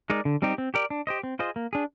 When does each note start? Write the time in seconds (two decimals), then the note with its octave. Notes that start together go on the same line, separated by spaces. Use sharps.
0.10 G#3 D#4 A#4 D5
0.25 D3
0.42 G3 C4 D#4 G4
0.58 C4
0.74 G4 A#4 D5
0.90 D4
1.07 G4 C5 D#5
1.23 C4
1.39 F4 G#4 C5 D#5
1.56 A#3
1.73 D4 G#4